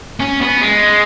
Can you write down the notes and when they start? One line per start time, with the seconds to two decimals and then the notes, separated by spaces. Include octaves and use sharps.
0.20 C#4
0.41 B3
0.62 G#3